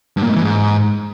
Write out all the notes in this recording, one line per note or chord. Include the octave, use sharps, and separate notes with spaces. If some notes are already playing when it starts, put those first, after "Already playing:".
G2
A#2
G#2
E3
G#2